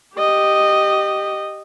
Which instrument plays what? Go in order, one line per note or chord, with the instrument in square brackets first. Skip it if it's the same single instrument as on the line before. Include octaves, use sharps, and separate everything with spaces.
[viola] G4 D#5